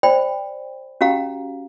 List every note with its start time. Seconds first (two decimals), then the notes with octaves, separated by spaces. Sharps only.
0.03 C5 D5 G5 B5
1.01 C#4 F#4 G4 F5 A#5